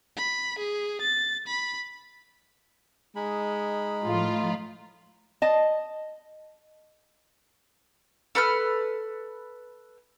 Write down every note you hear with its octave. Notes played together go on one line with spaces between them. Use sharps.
B5
G#4
A6
B5
G#3 D#4 B5
A2 F3 F4
D#5 A5
A4 B4 B5 F6